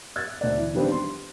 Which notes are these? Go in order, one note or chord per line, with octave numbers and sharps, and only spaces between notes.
E6 F#6 G#6 A6
D2 C5 D5
E3
D#3 F3 G3 B3 C4 D4
C6